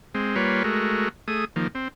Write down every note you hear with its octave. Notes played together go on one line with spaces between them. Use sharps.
G#3 C4
G3 A#3 F4 B4 C#5
G#3 A3 F#4 A#4
A3 G#4 D#6
D#3 F3 A#3
C4